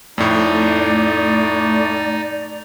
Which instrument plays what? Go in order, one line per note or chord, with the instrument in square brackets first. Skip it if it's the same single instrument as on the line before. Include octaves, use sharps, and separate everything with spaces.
[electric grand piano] F2 A2 [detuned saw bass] A3 [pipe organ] D#4 [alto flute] D5